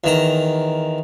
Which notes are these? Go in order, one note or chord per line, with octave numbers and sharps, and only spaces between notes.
E2 D#3 A#5